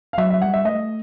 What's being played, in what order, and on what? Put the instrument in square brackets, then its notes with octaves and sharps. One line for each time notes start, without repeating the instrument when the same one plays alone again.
[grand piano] F5
[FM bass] F#3 [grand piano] E5
[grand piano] E5
[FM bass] G3 [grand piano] F#5
[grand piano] E5
[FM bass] A3 [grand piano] D#5